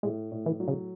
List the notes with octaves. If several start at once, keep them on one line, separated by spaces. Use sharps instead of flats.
A2 G#3
A2
E3
F#3
C#3